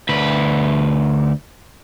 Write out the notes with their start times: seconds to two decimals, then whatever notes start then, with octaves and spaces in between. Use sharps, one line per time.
0.09 D2 B4